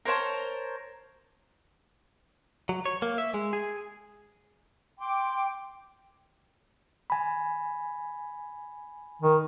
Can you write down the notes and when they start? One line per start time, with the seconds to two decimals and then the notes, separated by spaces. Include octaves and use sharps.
0.05 A#4 C5 C#5 A5
2.69 F#3
2.86 C#5
3.02 A#3
3.18 E5
3.34 G#3
3.53 G#4
4.99 G5 C6 D6
7.10 G#5 B5
9.22 D#3